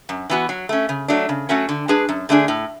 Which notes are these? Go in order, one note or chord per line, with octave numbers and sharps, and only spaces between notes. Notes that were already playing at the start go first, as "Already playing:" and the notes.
F#2
E3 B3 F#4
F#3
A3 C#4
C#3
F#3 A3 D4
C#3
F#3 A3 C#4 F#4
D3
G#3 D4 G#4 B4
F#2
D3 A3 D4 G#4
A2